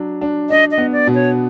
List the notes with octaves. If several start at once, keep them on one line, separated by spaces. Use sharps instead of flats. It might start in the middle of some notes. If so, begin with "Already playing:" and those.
Already playing: F#3 D4
D4
D4 D#5
D#5
B3
D5
B2
C#5